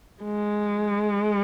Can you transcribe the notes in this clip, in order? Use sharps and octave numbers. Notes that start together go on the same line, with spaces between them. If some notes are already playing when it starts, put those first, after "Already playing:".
G#3